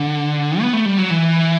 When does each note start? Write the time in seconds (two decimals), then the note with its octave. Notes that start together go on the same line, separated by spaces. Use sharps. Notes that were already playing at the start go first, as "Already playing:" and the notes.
Already playing: D3
0.61 B3
0.73 A3
0.86 G3
0.98 F#3
1.10 E3